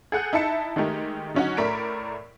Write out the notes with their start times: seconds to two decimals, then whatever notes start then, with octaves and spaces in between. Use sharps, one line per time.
0.12 G#4 A4 F#5 F#6 G6
0.33 D#4 E4 E5 A5 C#7
0.76 D#3 G#3 A3 D#4 G4 A#4
1.34 D3 F#3 C#4 D#4 F#4
1.57 A2 A3 A#4 D5 B6 D7